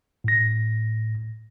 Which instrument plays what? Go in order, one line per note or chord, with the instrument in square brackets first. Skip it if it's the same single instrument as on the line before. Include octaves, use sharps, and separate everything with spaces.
[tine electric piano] A2 A#6